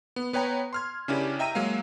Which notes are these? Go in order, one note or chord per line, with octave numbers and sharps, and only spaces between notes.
B3
B3 B4 C#5 G5 A#5
C6 F6 G#6
C#3 C#4 D4 E4 G4 A#4
D#5 E5 G5 A#5 E6 D#7
F#3 G#3 A#3 F5